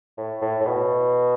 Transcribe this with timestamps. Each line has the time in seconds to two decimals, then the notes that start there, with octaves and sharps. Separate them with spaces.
0.18 A2
0.42 A2
0.61 A2
0.66 B2